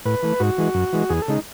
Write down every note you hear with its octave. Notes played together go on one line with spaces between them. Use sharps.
A2 B4
E3 A3
G#2 F#4
E3 G#3
F#2
E3 G#3
E2 G#4
A4
C#3 G#3 D#4